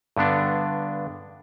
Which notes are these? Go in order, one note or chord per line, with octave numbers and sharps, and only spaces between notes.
G2 D3 B3 D4